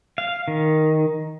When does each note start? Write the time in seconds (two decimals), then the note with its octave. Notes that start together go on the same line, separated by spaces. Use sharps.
0.18 F5
0.48 D#3